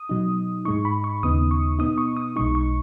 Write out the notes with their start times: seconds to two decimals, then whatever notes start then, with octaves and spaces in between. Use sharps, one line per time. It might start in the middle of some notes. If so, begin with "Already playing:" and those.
Already playing: D#6
0.09 B2 F#3 D#4
0.65 G#2 G#3 D#4 C#6
0.85 B5
1.04 C#6
1.23 D#2 C#3 B3 D#4 D#6
1.51 C#6
1.79 B2 B3 D#4 D#6
1.98 C#6
2.17 D#6
2.36 B1 B2 G#3 D#4 C#6
2.55 C#6